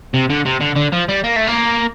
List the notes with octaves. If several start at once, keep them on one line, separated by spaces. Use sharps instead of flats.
C3
D3
C3
D3
D3
F3
G3
A#3
A3
A#3